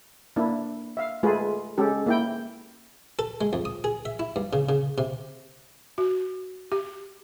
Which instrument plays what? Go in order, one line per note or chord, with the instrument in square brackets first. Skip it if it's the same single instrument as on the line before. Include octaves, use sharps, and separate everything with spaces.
[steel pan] A#3 D4 E4
E5 F5
G#3 A3 F4 G#4 B4
G#3 C#4 G4 A4
A#3 E4 G5
[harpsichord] A4
G#3
F2
D#6
G#4
E5
E4
G2
C#3
C#3
C3
[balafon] F#4
G4